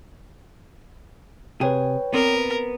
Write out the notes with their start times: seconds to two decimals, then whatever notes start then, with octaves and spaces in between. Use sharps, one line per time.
1.61 C3 G#4 B4 C#5 G5
2.14 B3 C4 A#4 D5